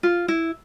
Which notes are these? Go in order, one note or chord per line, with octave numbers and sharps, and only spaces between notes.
F4
E4